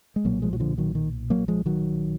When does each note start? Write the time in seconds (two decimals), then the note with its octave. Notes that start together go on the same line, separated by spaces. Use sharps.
0.16 G#3
0.25 B1 A#2 F#3 A#3
0.42 F3 G#3
0.53 F#3
0.60 D3 F3
0.78 D#3 F#3
0.95 D#3
1.30 F#3 A#3
1.48 F3 G#3
1.66 D#3 F#3